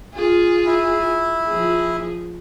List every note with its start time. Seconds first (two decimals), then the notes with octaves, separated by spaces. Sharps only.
0.14 F4 G#4
0.66 E4
1.47 F3 G#4